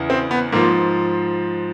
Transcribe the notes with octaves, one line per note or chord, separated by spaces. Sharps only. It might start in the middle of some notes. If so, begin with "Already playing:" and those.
Already playing: E2 C#3
C4
B3
G#2 F3 A#3